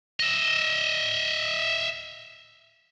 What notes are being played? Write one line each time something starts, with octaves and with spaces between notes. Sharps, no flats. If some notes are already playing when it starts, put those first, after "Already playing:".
D#5 E5